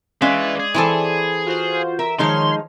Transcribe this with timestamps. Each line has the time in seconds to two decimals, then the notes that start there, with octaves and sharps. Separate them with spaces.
0.22 G#3 C#4 B4 D5 E5 F5
0.60 G#4
0.74 E3 C4 E4 A4 G#5 A5
1.46 F4 F#4 C5
1.99 A#4 E5
2.19 D#3 F3 G#3 D#4 C#5 C6 F6